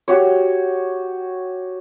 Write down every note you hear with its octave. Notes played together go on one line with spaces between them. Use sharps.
F#4 G4 C#5